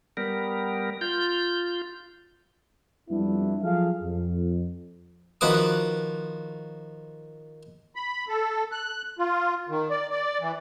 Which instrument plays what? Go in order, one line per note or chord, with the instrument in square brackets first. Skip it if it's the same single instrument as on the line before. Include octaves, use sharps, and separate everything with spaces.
[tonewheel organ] G3 B3 A#4
F4 G6
[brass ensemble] F2 G3 B3 D4 E4
F3 F#3 G#4 A4 F5
F2
[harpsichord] D#3 F3 F#4 B4 D6 D#6
[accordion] B5
A4
F#6
F4
D#3
D5
D5
E3